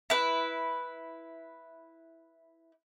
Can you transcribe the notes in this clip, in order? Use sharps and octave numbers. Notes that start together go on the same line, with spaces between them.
E4 B4